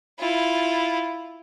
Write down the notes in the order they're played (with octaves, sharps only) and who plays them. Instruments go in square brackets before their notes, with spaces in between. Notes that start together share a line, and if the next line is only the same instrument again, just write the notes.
[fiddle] E4 F4